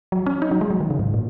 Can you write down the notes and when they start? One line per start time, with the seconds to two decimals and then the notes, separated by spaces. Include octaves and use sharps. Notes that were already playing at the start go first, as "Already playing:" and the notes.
0.12 F#3
0.26 C#4
0.42 D#4
0.51 F#3
0.61 G#3
0.70 F#3
0.80 D#3
0.90 C#3
0.99 G#2
1.14 A#2